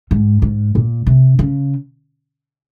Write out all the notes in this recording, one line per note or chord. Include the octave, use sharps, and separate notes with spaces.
G#2
G#2
A#2
C3
C#3